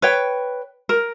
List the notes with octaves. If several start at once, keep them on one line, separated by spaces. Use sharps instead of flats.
B4 C#5 G5
A#4